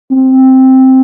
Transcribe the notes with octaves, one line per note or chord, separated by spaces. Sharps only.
C4